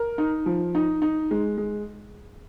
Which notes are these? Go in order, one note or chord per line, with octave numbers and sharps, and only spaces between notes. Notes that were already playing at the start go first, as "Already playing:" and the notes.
Already playing: A#4
D#4
F3
D#4
D#4
G#3
G#3